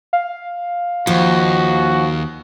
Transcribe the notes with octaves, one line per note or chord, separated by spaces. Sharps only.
F5
D#2 F3 F#4